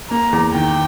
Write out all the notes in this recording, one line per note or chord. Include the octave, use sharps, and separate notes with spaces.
A#3 A#5
E2
D#3 G5